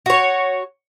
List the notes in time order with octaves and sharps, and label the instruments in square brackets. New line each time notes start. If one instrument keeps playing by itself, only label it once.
[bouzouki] F#4 C#5